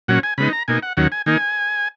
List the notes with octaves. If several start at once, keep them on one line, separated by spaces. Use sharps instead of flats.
A#2 F#3 C#4 F#5
G#5
C#3 G#3 B3 D#4 B5
A#5
B2 A#3 D#4 G#5
F#5
D#2 D#3 F#3 C#4 F#5
G#5
D#3 A#3 D#4 G#5